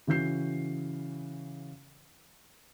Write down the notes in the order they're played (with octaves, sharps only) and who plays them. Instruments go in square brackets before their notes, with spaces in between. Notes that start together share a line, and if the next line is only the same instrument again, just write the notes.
[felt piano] C#3 E3 F#4 G6 C7